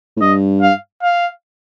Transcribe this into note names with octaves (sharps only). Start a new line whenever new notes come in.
A2
G2 D#5
F5
F5